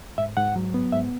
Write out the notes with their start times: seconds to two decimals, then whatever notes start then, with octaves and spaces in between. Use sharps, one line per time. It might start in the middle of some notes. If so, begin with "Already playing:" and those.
0.18 G#2 E5
0.37 G#2 F#5
0.56 F#3
0.74 B3
0.93 G#2 E5